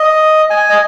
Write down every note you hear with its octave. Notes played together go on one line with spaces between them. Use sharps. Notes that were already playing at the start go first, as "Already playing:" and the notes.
Already playing: D#5
G#5
D#5